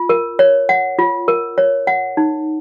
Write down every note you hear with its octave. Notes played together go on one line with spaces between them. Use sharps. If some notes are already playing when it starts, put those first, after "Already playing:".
Already playing: F4
A#4
C#5
F#5
F4
A#4
C#5
F#5
D#4